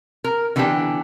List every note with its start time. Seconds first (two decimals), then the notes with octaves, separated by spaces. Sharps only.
0.24 A#4
0.56 D3 E3 B3 D4 G4